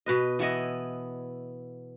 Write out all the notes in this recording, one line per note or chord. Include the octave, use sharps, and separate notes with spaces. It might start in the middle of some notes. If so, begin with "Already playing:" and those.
B2 B4 D#5
E3 B3 E4 D#5